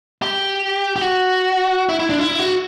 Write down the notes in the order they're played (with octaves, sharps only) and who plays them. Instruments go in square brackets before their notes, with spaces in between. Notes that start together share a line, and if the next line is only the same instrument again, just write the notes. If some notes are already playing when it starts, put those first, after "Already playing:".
[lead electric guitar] G4
G4
F#4
E4
E4
D4
E4
F#4